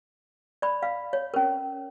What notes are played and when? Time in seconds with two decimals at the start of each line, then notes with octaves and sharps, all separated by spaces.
0.62 D5 B5
0.83 F5
1.13 C#5
1.34 C#4 A#4